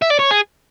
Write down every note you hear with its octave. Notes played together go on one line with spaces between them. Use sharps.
E5
D5
C#5
G#4